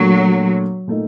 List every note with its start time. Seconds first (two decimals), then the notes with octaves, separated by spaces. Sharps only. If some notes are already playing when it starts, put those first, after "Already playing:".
Already playing: A#2 F#3 A3 D4
0.88 A#2 A3 D#4